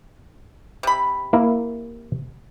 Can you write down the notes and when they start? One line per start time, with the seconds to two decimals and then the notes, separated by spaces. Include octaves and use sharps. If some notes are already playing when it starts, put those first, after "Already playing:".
0.83 C3 B5
1.33 A#3 E4 A#4